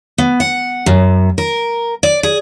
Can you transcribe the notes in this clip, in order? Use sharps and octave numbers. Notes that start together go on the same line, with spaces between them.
B3
F#5
F#2
A#4
D5
G#4